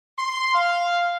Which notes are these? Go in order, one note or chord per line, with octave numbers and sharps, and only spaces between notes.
C6
F5